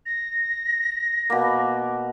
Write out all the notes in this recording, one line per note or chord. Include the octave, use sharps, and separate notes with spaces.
A#6
B2 A#3